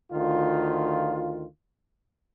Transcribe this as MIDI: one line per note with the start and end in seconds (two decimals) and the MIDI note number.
0.12 1.45 38
0.12 1.45 51
0.12 1.45 65